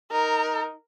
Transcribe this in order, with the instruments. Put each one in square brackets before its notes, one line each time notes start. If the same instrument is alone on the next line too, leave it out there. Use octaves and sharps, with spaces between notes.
[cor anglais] D#4 [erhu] A#4